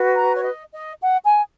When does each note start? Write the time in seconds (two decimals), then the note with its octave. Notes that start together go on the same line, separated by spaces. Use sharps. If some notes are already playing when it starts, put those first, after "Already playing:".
Already playing: F#4 B4
0.14 A#5
0.35 C#5
0.43 D#5
0.72 D#5
1.01 F#5
1.24 G#5